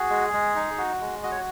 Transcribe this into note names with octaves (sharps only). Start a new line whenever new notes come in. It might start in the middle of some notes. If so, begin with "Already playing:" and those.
Already playing: F#4 G#4
G#3
G#3
D#4
F#4
G#3
F#4 D#5
C#5